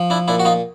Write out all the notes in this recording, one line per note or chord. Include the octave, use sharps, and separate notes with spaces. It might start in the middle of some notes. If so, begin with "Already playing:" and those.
Already playing: F3
D4 E4
A#2 D4 E4
F#4
D#4 F4